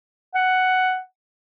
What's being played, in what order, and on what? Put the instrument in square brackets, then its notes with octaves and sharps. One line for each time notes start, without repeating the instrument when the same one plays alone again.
[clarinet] F#5